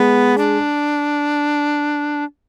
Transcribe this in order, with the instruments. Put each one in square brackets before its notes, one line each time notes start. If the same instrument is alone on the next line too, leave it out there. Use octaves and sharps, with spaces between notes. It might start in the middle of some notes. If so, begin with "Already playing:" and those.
Already playing: [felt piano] G#3 [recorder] B3
[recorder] D4